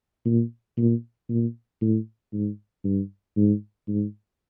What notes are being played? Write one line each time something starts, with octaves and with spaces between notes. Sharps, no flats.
A#2
A#2
A#2
A2
G#2
G2
G#2
G#2